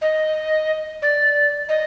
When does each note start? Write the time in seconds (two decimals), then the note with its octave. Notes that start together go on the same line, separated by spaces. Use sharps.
0.02 D#5
1.02 D5
1.69 D#5